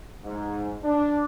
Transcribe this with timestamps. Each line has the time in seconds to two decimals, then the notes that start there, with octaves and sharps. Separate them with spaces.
0.23 G#2
0.82 D4